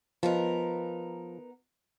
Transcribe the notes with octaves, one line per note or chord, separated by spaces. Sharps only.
F3 B3 D#4 A#4